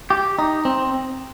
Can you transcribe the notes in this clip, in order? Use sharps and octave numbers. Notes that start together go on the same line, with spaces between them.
G4
D#4
C4